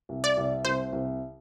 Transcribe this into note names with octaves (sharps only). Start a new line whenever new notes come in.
C2
D5
C2
C2 C5
C2